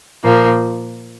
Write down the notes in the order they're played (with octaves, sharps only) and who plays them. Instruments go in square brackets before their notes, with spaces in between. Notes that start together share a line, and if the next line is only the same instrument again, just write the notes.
[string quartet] A#2 F3 A#3